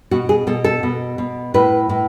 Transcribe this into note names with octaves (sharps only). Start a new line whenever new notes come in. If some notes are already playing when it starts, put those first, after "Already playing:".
B2 F#4
G#4
B2 A4
A4
B2
B2
A2 B4
A2